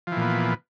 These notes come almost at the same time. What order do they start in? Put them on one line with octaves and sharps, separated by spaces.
F3 E3 A#2 B3